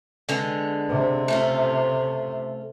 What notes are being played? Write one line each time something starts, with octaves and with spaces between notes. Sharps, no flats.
D3 G#3 B3
C3
A3 C#4 F4